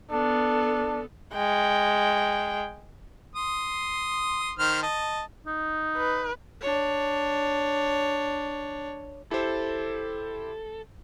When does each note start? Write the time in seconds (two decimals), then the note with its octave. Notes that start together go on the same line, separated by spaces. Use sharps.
0.11 B3 D4 A4
1.35 G#3 G5
3.36 C6 D#6
4.59 D#3 C5 F6
4.83 D#5 A5
5.47 D#4
5.97 B4
6.61 D4 C#5
9.31 E4 G4 A4 C5